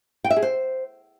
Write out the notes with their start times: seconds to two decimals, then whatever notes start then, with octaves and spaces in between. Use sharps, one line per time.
0.24 G5
0.30 E5
0.36 G#4
0.43 C5